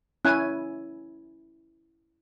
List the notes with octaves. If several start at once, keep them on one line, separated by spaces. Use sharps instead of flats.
C#4 E4 G#5 F#6